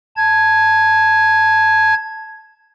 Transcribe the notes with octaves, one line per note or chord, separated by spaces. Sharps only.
A5 G#6